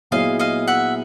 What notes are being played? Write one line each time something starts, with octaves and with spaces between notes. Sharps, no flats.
A#2 F#3 B3 E4 G#4 D#5 F5
D#5 F5
E5 F#5